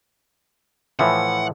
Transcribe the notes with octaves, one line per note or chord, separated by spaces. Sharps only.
A2 E3 F3 F#5